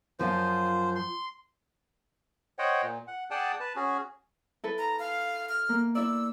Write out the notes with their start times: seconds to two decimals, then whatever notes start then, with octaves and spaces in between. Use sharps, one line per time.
0.19 F#2 F3 F4 C5
0.96 C6
2.59 C5 C#5 D#5 F#5 G5
2.82 A#2
3.08 F#5
3.31 G#4 D5 F#5 G5 A5 D#6
3.60 B4 A5
3.76 C#4 F#4 G#4
4.64 E4 A4 B4
4.78 A#5
4.99 F5
5.49 F6
5.69 A#3
5.95 E4 D5 E6